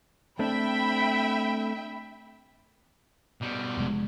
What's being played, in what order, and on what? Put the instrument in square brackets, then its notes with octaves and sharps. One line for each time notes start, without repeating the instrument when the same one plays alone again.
[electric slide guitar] A3 C4 D4 [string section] E5 G5 B5
[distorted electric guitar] B2 G3
[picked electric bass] F1 G#3